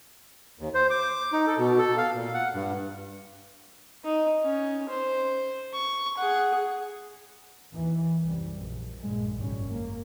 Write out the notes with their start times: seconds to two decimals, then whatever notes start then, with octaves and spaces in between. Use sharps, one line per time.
0.59 D#2
0.74 C5
0.90 D6
1.33 D#4
1.47 A4
1.58 B2
1.78 A4
1.98 F5
2.15 A#2
2.34 F#5
2.54 G2
4.05 D#4
4.43 C#4
4.89 C5
5.73 C#6
6.18 G#4 F#5
7.73 D#2 E3
8.24 C2 F#2 G3
8.56 A#1
9.01 A#1 G2 G#3
9.36 G#1 C#2 F#2 G3 C#4
9.69 A#3